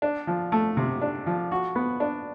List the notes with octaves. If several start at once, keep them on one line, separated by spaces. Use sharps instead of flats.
D4
F3
A3
C3
D4
F3
F#4
B3
D4